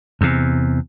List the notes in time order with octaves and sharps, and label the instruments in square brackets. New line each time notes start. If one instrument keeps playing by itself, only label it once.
[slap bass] E2 C3